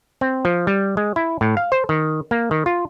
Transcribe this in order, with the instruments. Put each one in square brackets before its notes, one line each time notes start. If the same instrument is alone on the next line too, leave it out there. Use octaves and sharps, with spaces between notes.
[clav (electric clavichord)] C4
F3
G3
G#3
E4
A2
F5
C5
D#3
A#3
D#3
F4